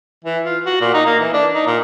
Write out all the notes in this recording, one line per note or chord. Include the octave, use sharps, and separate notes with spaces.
E3
F4
F#4
A#2
D#4
A#3
E3
D4
D#4
A#2